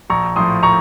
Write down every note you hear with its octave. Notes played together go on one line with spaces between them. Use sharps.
A#1 A#5 C#6
A2 F3 C6 D#6
A#5 C#6